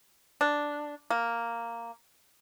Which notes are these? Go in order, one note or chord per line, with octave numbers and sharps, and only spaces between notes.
D4
A#3